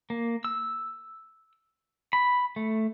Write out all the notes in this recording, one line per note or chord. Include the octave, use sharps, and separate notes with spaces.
A#3
E6
B5
A3